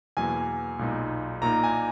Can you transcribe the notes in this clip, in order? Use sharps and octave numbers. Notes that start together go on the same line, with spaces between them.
E2 B2 F#3 A#3 G#5
B1 A#2 G#3 D#4
A#2 A#3 D#4 A#5
G#5